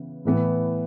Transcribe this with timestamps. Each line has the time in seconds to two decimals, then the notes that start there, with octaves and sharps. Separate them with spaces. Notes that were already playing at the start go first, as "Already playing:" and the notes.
Already playing: C#3 E3 B3
0.25 A2 E3 B3